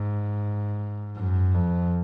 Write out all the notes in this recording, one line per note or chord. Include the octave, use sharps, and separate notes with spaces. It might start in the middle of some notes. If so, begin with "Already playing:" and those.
Already playing: G#2
F#2
F2